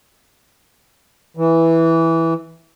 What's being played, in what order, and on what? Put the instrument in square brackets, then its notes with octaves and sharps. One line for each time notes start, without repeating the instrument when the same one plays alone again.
[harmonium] E3